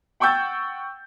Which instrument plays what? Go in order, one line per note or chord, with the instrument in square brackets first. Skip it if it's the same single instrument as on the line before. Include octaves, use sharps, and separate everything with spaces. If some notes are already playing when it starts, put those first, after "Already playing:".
[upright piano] F#5 G5 C#6 E6 G6 A6